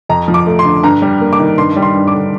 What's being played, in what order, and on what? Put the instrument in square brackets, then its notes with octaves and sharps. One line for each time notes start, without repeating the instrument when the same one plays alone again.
[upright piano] F2 A#5
F3
D6
A3
C6
D3
G2 A#5
G3
A#3
D6
D#3
G2 C6
G3
C6
G2
D6
D3